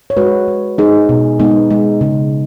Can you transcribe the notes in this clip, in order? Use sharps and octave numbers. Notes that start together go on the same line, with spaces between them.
C#5
G#3 F#4 B4
G#3
G#3 D#4 G#4
B2
G#3 B3 D#4
G#3
C#3